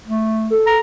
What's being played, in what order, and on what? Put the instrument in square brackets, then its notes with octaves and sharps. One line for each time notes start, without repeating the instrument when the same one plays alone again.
[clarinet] A3
[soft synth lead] A4
[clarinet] A#5